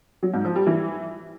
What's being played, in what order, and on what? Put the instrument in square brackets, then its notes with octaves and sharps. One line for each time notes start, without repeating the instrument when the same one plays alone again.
[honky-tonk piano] F#3
G#2
F3
G3
E3